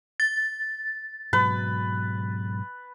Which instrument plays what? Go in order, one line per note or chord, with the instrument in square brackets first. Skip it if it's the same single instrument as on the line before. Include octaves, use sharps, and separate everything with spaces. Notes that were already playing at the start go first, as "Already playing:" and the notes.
[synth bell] A6
[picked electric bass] G#2 B2 F#3 [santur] B4